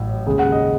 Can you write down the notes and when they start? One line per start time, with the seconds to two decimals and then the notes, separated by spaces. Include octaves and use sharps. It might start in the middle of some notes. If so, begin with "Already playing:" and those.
Already playing: A1 A2 F#3
0.27 D#2 C#3 G#3
0.39 F#5
0.52 D#5